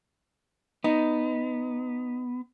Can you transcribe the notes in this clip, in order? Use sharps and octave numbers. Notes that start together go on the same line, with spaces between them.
B3 D#4